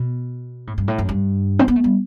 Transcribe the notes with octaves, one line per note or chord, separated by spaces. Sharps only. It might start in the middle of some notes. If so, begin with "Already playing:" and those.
Already playing: B2
A2
G2
A2
F#2
G2
C4
B3
A3
G3